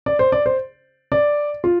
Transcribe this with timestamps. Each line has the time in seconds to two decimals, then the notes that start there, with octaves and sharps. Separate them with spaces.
0.06 D5
0.19 C5
0.32 D5
0.46 C5
1.12 D5
1.64 F4